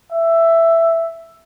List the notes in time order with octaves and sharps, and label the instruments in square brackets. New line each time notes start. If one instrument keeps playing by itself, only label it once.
[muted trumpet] E5